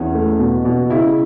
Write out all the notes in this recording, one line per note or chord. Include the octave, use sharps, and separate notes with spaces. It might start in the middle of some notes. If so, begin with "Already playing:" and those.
Already playing: E2 C#4
A3
B2
B2
C#3 E4